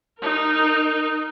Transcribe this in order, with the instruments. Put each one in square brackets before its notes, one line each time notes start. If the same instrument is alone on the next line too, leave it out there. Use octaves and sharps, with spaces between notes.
[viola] D#4 A#4